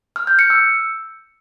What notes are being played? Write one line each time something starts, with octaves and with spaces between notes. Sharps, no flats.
F6
G6
C#7
E6